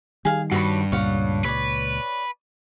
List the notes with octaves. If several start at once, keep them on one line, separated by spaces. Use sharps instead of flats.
D#3 G3 G#4 F5
G2 F#4 C#5 B5
C#2 A#2 C#5 F5 F#5
B4 C#5 D5